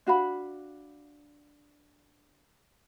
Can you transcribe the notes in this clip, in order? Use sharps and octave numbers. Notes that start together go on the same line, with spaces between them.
D4 F#4 F5 B5